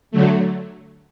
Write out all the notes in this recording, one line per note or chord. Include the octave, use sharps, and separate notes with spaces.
D3 F#3 A3